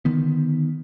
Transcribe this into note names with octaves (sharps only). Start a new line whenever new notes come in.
D3 D#3 B3